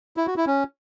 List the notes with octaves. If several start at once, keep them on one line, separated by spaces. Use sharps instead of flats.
E4
F#4
E4
C#4